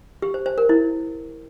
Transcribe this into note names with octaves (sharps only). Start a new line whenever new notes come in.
G4
C5
C5
A#4
E4